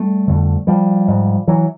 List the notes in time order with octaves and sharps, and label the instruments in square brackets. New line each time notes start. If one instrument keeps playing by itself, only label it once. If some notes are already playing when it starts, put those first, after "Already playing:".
Already playing: [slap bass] G3 A3
F2 D3
F3 G3
G#2
E3 F#3